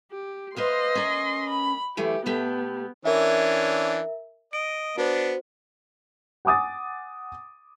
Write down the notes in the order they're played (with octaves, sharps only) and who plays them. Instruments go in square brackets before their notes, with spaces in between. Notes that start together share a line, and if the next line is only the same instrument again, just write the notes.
[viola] G4
[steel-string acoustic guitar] B4 C5 F5 [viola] D#5 C6
[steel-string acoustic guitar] C#4 A#4
[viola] B5
[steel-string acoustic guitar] E3 F#3 A3 [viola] G4
[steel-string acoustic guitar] B2 A3 G4 [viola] B3
[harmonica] E3 C#4 D4 [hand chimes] A#4 E5
[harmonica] D#5 [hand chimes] D7
[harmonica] B3 D4 [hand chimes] F#4 C5
[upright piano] F#5 G#5 D6 D#6 A6